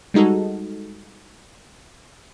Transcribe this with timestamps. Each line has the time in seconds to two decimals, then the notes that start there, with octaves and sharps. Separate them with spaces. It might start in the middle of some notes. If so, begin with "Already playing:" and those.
0.14 G3 G#3 D#4 F#4 A4